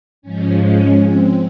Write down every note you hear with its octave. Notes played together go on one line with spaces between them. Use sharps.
G#2 F3 G#3 C#4
C#4
C4